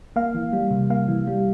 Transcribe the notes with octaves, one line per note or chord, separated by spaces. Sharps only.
A#3 F5
E3
G3
C3
A#3 F5
E3
G3